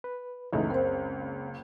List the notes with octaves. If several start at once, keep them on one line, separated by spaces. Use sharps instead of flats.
B4
F#1 C#2 E3 A3 D#4
C4 A#4 C5